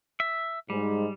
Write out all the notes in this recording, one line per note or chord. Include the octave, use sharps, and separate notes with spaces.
E5
G#2 G3 G#3